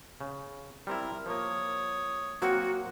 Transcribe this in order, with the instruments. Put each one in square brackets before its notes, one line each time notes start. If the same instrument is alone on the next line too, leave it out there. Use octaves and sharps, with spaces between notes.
[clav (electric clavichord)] C#3
[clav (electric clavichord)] G3 C4 E4 [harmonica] A#4
[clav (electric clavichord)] F3 A#3 [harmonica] C#5 D#6
[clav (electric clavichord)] F#3 A#3 C4 [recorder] F#4